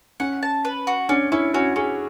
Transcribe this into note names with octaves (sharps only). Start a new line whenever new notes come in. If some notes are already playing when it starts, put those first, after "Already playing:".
C#4 F#5
A5
B4
F#4
C#4 D4
C#4 E4
C#4 F#4
C#4 G#4